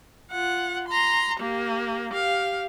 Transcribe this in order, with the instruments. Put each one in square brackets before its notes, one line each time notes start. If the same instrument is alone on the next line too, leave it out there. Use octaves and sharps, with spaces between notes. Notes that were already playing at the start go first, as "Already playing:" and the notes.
[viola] F4 F#5
A#5 C6
A#3 G4
G4 F5